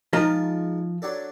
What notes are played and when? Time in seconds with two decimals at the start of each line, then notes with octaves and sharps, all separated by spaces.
0.13 F3 G#3 D#4 F4 A#5
1.02 F#3 D4 A4